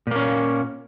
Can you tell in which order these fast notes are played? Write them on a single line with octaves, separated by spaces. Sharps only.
A#2 A#3 C#4